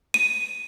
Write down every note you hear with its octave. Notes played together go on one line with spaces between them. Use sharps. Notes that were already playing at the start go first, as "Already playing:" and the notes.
D#7